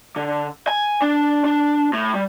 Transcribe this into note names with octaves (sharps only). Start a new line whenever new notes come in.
D3
G#5
D4
D4
A2
G3